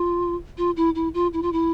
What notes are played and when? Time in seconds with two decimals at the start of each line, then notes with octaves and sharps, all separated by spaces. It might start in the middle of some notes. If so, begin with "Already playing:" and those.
Already playing: F4
0.58 F4
0.77 E4
0.95 E4
1.14 F4
1.33 E4
1.42 F4
1.53 E4